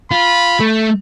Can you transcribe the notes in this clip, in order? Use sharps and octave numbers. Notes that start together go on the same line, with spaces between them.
F4 B5
A3